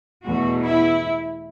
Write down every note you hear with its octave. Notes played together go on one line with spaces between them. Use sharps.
E2 B2 A3 F#4
E4